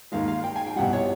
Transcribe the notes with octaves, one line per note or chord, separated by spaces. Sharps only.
D#2 D#3 G#3 F5
F5
G5
G#5
G5
C2 B2 G3 F#5
C#5